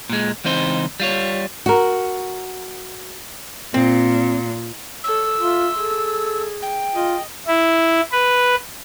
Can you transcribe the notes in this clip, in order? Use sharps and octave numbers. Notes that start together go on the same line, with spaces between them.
A#2 G#3
C#2 E3 C4 D#4 C5
G3 F4 C#5
F#4 A#4
A#2 C4
A4 C#5 E6
F4 E5 C6
G#4 A4
G5
F4 D#5
E4
B4